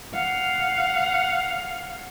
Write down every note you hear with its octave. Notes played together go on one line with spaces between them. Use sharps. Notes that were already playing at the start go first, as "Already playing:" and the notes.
F5 F#5